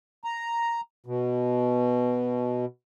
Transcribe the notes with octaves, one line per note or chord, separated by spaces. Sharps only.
A#5
B2